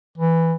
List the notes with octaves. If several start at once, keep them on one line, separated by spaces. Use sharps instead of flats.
E3